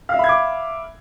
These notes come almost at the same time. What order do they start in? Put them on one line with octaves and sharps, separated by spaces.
F5 E5 B5 G#6 D6